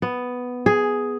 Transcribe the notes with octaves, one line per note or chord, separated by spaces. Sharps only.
B3
G#4